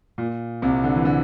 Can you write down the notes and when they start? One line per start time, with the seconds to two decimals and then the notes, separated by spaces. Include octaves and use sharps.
0.18 A#2
0.62 C2 C3
0.84 D3
0.95 E3
1.05 D3